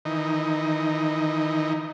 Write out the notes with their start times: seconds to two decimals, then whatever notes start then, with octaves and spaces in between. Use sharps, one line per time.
0.05 D#3 E3 D#4